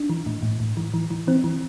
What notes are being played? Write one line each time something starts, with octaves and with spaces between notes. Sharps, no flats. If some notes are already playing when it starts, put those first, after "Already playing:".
Already playing: D4
E3
A2
A2
A2
E3
E3
E3
E3 C4
E3